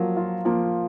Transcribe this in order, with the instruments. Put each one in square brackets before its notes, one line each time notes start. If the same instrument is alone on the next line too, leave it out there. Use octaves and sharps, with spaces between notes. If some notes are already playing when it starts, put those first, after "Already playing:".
Already playing: [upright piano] F3 A#3 [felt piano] F#3
[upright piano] F4
[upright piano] F3 [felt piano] A#3